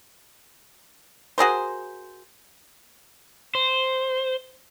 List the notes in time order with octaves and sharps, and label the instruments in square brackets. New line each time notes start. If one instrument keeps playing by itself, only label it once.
[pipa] F#4 G#4 A#4 C5
[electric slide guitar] C5